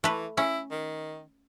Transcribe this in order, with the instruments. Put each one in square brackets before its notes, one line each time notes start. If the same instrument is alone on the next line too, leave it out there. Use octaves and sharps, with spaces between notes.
[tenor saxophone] E3 [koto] A3 B4
[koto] C#4 [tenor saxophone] E4
[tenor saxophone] D#3